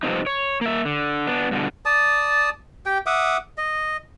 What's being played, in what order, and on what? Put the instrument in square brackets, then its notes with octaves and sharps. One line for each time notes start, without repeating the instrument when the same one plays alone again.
[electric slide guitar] G2 C3 F3 C4 D#4
C#5
A#3 E5
D3
B3 D4
G2 B2 D3
[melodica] D5 A5 D#6
G4 G5
E5 F#5 D6 D#6
D#5